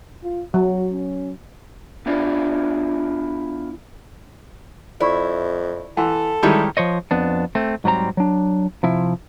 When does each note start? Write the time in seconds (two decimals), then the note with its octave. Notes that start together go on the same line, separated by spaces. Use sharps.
0.23 F4
0.54 F#3 F#4
0.92 C#4
2.06 B3 D4 E4 F4 D5
5.00 F2 E4 D5 B5 C#6
5.97 E3 A4 F#5 C6
6.43 D#3 E3 G3 G#3 C#4 E4
6.77 F3 C5 C#5 D#5
7.11 F2 B3 D4
7.55 A3 C4
7.84 G#2 F#3 G3 C4 A#5
8.17 F#3 D4
8.83 C3 F3 E4